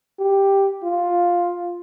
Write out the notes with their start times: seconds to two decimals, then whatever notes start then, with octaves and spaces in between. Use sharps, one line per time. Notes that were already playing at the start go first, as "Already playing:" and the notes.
0.20 G4
0.83 F4